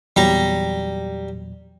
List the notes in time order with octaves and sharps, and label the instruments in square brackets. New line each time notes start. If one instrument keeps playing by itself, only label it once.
[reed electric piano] E2 A#2 F#3 [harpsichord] G3 A#5